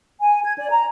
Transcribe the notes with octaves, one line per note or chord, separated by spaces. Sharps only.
G#5
G#6
D5
A#5